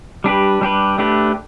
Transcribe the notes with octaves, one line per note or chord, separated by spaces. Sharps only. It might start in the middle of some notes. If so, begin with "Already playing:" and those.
G3 D4 G4 B4
G3 D4 G4 B4
A3 D4 G4 B4